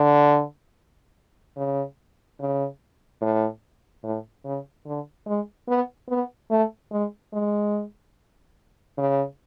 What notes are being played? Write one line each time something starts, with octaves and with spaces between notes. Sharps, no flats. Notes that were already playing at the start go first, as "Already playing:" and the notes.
Already playing: D3
C#3
C#3
A2
A2
C#3
D3
G#3
B3
B3
A3
G#3
G#3
C#3